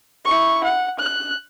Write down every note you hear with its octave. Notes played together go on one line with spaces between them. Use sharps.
E4 C#6
F#5
F#6